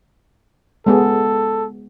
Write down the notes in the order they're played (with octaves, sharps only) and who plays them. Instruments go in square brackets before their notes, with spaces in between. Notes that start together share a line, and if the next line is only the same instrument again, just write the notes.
[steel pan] G#3 B3 G#4 [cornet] A4